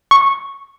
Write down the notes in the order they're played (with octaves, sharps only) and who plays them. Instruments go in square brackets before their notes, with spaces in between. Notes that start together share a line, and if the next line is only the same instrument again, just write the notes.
[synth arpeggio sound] C#6